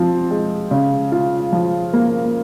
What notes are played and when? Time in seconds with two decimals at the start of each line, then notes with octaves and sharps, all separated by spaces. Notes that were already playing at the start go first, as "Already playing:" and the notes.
Already playing: F3 C4
0.30 G#3
0.71 C#3
1.12 F4
1.53 F3
1.93 A#3